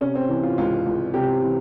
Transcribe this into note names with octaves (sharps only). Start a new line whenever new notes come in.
C3 C#4
C4
E3
F4
C#2 F4
C#2
C3 G4
E3